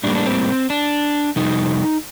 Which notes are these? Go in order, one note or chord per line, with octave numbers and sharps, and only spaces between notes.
A2 G3 A#3 D4
D4
C4
D4
F2 C3 G3 D#4